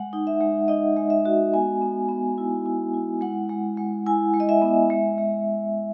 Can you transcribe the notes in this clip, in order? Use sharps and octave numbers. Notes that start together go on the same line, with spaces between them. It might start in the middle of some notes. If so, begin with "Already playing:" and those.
Already playing: G#3 F#5
D#4
E5
G#3
D#4 D#5
G#3
E5
F#4
B3 G#5
B3
B3
E4
E4
E4
G#3 F#5
G#3
G#3
E4 G#5
G#3
D#5
E5
B3
G#3
G#3